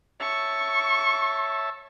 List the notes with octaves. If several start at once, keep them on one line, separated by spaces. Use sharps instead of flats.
C#5 E5 A5 C#6